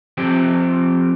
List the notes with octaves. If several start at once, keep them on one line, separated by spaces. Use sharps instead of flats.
F3 C4 G4